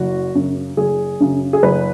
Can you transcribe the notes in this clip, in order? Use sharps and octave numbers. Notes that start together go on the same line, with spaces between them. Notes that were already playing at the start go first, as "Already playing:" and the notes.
Already playing: F#1 F#4
F#2 C#3
F#1 G#4
F#2 C#3
G#4
F#1 B4